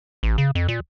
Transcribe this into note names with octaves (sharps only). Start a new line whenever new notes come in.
A1
C#3
F2
A#2